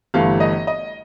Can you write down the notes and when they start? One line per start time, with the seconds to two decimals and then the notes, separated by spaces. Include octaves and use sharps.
0.14 G1 G2 E3 A3 F5
0.40 D#5
0.67 D#5